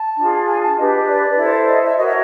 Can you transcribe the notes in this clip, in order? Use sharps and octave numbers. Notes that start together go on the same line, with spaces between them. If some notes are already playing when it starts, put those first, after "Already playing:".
Already playing: A5
D4 F4 G#4
G#5
A5
D4 G4 B4 D#5
D5
E4 A4 C5
D#5
E5
F#4 A#4 C#5 D#5
E5